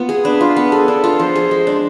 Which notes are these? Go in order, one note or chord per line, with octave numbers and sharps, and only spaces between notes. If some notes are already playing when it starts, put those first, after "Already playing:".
Already playing: B3 F4
G#4
D4 B4
F4
B3
G#4 A4
D4
F4
F3 C5
G#4
G#3
D4